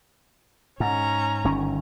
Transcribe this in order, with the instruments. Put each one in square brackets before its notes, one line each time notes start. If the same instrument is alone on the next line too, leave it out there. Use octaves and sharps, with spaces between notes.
[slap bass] G#2 [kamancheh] C#4 A#5
[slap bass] G1 D#3 C#4